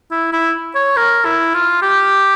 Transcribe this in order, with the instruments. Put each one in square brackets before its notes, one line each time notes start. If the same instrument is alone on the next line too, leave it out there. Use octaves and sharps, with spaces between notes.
[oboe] E4
E4
C#5
A#4
E4
F4
G4